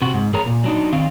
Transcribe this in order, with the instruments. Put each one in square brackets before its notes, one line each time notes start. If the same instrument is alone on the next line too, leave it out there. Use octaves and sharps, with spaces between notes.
[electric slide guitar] C3 F#4
G#2
E2 G#4 A#4 C#5 A#5
A#2
F#3 D4 D#4
D#3 C4 F5